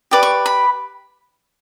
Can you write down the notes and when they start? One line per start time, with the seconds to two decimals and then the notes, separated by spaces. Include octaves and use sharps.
0.11 G4 B4 D5 D6
0.23 C#6
0.46 B5